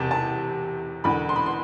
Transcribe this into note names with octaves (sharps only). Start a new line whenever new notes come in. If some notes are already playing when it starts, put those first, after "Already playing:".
Already playing: E1 E2 C3 A5
A5
E1 E2 D3 B5
C6
B5
C6